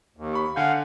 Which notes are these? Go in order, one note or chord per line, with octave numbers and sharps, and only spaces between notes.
D#2
B5 C#6
D3 F5 F#5 G#5 G6